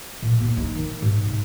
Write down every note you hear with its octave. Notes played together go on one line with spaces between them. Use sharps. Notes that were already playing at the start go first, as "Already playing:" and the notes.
A#2
A#3
D#4
D#3
G#2
C3